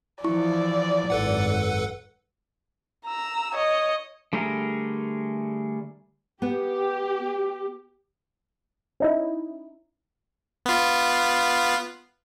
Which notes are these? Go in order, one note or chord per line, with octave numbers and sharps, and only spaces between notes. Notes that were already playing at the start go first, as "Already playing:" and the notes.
E3 F3 E4 D5 C#6
G#1 F#2 A4 B4 F#5
A#5 E6
C#5 D#5
D3 G3 A3 G#4 A#4
B3 G4
C#4 D#4 E4
B3 F4